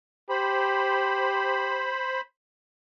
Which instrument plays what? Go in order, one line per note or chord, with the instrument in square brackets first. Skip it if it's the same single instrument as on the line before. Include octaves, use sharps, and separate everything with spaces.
[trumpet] G4 [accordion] C5 B5